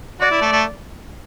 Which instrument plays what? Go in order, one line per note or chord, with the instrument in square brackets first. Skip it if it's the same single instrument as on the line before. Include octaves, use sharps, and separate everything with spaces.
[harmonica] F#4 [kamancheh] D5
[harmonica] E4
A3
A3